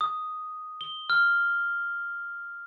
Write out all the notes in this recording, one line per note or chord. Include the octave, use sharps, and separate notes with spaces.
D#6
G7
F6